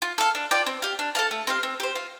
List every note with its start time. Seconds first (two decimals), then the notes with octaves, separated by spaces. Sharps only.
0.02 F4
0.18 A4 F5
0.35 D4
0.51 F4 D5 G5
0.66 C4
0.82 G4 F5
0.99 D4
1.15 A4 F5 A5
1.31 A3
1.47 C4 G4 F5
1.63 C4
1.80 G4 C5
1.95 F4